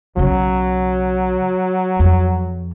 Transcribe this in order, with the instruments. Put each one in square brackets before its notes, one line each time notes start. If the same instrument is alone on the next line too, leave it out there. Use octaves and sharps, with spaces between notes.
[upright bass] B1 C#3 [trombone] F#3
[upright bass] F2